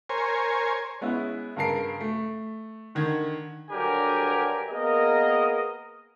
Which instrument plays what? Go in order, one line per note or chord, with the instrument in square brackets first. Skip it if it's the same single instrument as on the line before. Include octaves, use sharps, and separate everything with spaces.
[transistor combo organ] A#4 C5 C#5 G#5
[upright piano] G#3 B3 C#4 E4
G2 C#3 A#4 A5 C7 D7
A3
D3 D#3 G#6
[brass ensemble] G2 D3 F#3 G4 A#4 G#5
A#3 B3 G#4 A#4 D#5